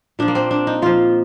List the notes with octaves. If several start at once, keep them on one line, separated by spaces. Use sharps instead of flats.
A#2 F3 D4
A#3
C4
D4
D#4
A#2 F3 F4